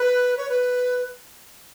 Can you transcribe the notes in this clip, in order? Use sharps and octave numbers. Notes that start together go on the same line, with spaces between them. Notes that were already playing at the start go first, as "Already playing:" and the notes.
Already playing: B4
C#5
B4